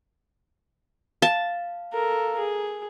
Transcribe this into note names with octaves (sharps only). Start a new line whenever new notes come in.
F5 A5
A4 A#4
G#4